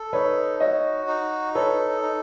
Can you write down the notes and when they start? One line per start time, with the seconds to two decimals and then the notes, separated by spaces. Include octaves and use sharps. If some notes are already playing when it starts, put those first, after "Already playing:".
Already playing: A4
0.13 D#4 B4 C#5
0.60 F#4 C#5 D#5
1.07 D#4
1.55 A4 B4 C#5
2.02 D#4